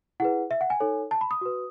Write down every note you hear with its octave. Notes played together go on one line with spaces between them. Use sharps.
E4 G#4 B4 F#5
E5
F#5
G#5
D#4 A4 C#5
A5
B5
D#6
F#4 B4